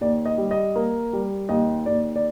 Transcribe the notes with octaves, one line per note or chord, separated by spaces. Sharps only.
D#2 D5
D#5
G3
D#5
A#3
G3
D#2 D#5
D#2 D5
D5